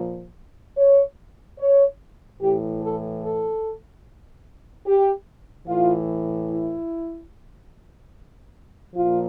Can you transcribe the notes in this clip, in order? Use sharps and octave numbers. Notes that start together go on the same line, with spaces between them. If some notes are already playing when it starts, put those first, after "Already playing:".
Already playing: A#2 F3
C#5
C#5
A2 E3 G4
A4
A4
G4
A2 E3 F4
E4
A#2 F3 F4